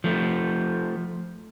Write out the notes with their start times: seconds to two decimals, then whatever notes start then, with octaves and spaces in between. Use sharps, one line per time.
0.04 F3 A3